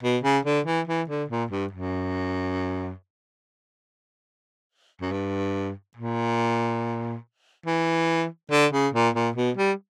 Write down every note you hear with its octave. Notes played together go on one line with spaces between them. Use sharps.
B2
C#3
D3
E3
E3
D3
A#2
G2
F#2
F#2
G2
A#2
E3
D3
C#3
A#2
A#2
B2
G3